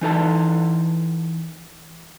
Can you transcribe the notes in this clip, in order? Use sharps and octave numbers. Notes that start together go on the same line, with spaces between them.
E3 D#4 A4 A5